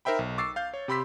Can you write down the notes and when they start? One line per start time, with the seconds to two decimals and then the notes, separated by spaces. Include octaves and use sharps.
0.05 D#4 A#4 C5 E5 G5 B5
0.19 B1
0.38 C#6 D6 E6 A6 C7
0.56 F5 G6
0.74 C#5
0.88 C3 G4 B5 C6 E6 B6